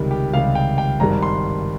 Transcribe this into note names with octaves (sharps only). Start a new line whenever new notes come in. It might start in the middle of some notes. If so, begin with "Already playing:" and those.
Already playing: C#2 C3 D#3 G3
G4
C#2 C3 D#3 G3 F5
G5
G5
G#1 G2 D#3 G3 A#5
C6